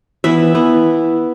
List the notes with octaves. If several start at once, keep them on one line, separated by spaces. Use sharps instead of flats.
E3 B3 E5
E3 B3